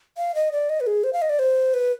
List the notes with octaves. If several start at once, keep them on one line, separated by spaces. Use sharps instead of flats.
F5
D#5
D5
D#5
B4
G#4
C5
F5
D#5
D5
C5
B4